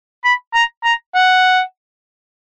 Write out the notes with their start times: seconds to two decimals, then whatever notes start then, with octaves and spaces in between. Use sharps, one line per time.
0.24 B5
0.54 A#5
0.84 A#5
1.15 F#5